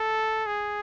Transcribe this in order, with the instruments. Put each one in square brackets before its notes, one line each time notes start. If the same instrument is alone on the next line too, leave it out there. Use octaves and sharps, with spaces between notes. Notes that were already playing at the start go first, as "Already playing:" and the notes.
Already playing: [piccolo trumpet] A4
G#4